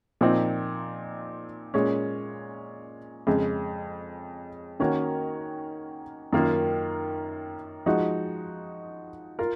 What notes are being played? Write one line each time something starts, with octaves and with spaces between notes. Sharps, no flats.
A#2 F3 C4 D#4
A#2 G#3 C#4
F2 C#3 G#3
D#3 A#3 C#4 F#4 A#4
F#2 D#3 A#3 F4 A#4
F3 G#3 D#4 F#4
F4 A#4